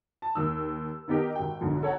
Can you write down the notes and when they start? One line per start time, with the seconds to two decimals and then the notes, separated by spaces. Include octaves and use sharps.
0.22 A5
0.35 D#2 D#3 E6
1.08 D#3 B3 D#4 G4 A#4
1.35 G#1 G5
1.61 B1 G#2 D3 F3
1.83 A4 C#5 F#5 A#5